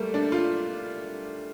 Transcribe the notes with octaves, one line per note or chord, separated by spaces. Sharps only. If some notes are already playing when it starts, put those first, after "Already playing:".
Already playing: G3 A3 A#3
D4
F4